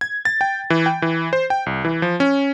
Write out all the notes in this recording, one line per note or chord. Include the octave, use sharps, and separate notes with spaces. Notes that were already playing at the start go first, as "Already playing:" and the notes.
G#6
A6
G5
E3
G5
E3
C5
G5
C2
E3
F3
C#4